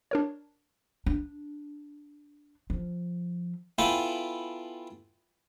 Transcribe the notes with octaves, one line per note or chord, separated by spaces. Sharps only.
D4 A#4 C#5
D4
F3
B3 E4 F4 A4 G5 G#5